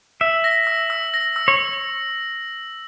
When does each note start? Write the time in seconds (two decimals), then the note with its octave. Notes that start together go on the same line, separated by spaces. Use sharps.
0.21 E5 E6
0.44 A#6
0.67 E6
0.90 E6
1.14 A#6
1.36 E6
1.48 C#5